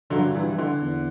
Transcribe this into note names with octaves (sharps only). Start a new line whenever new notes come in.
G2 D3 F#3
C3 E3
E3
D3
E2